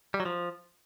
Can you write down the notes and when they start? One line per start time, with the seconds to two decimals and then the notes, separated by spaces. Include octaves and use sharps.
0.14 G3
0.20 F#3
0.26 F3